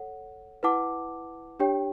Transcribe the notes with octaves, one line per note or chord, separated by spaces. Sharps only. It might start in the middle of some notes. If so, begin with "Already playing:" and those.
Already playing: A4 C#5 F#5
E4 B4 F#5 A5 D6
D4 G4 C#5 G5